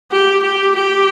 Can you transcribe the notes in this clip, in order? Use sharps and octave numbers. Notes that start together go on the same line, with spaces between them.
G4
G4
G4